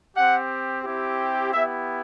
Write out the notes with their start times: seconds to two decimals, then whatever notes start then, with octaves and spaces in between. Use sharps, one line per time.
0.15 C4 G4 F#5
0.84 C4 E4 G4
1.53 B3 E4 G4 E5